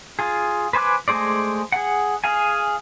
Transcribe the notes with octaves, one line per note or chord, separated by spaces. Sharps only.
F4 G#4
B4 C5 G#5 D6 F#6
G#3 A3 G#4 C5 D5
G#4 F#5
G#4 F5 G#5